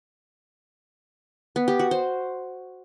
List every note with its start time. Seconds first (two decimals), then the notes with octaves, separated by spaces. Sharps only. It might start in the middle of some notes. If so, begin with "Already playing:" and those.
1.56 B3
1.68 G4
1.79 F#4
1.91 C5